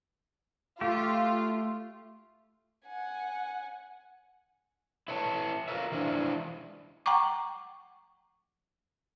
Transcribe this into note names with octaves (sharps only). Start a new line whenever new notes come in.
A3 F4 G4
F#5 G#5
E4 B4 C#5 A5
F4 A#4 B4 E5
E3 F3 G#3 D4 E4
F#5 G5 A#5 C#6 D6